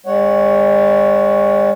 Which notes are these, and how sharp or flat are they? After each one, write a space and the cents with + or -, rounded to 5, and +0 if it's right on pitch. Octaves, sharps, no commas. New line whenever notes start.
G#3 -45 C#5 +0 F#5 +10